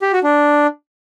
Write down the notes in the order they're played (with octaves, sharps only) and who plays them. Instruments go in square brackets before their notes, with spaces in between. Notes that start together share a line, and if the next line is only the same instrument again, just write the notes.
[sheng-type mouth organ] G4
F#4
D4